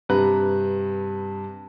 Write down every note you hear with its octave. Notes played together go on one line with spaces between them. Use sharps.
G2 C3 B4 A#5 F#6